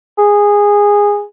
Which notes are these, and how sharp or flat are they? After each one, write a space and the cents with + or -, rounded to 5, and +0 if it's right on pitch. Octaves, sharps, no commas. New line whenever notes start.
G#4 -15